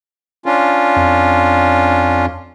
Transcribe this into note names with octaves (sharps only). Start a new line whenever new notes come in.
C#4 D4 F4
F2